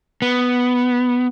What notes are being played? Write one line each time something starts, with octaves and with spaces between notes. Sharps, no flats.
B3